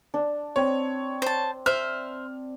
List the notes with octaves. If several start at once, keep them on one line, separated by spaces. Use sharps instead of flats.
D4
C4 C#5
C5 A5
C5 E5 F6